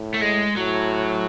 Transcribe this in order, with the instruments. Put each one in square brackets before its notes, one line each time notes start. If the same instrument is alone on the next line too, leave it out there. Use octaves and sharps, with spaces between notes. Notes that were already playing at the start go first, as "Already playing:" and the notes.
Already playing: [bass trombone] A2
[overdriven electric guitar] A3
G#3
[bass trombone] A2 [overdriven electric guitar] F#3